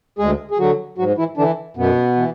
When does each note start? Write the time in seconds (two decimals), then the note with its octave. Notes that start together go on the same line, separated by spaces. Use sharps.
0.19 D2 G#3 G#4
0.51 G#4
0.59 D3 F#3 F#4
0.98 G#2 F#3 F#4
1.18 E3 E4
1.37 D3 E3 D4
1.77 F#2 B2 B3
2.16 E3